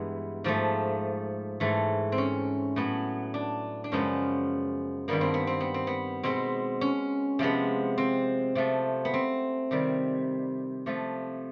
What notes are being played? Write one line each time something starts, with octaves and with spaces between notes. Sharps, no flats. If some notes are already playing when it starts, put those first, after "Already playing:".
Already playing: G2 E3 G#3 B3
G#2 F3 A3
G#2 E3 A3
C4
C#4
A2 F#3 B3
D4
D4
F#2 C#3 F3 G#3 B3 C#4
G2 D#3 G3 A#3 B3
C4
B3
C4
B3
C4
B3
B2 G#3 B3 C4
C#4
C3 F3 G#3 B3
C4
C3 F3 A3
B3
C4
C3 D#3 G3
C3 F3 A3